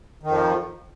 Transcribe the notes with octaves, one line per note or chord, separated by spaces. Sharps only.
F2 D#3 F3